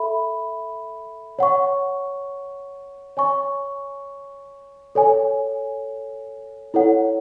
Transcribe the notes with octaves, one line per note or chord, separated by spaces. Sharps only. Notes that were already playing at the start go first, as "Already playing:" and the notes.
Already playing: A4 E5 B5
C#5 F#5 C#6
C#5 G#5 C#6
A4 C#5 G#5
E4 A4 C#5 F#5